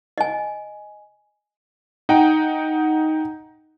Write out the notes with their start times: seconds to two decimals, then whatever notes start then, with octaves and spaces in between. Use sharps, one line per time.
0.18 D#5 G#5
2.09 D#4 F#5 G5 A#5